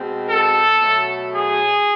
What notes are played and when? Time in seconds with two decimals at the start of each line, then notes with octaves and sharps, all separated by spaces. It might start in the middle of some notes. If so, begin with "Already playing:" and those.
Already playing: B2 G#3 C4
0.27 A4
0.79 B2 F#3 A3
1.32 G#4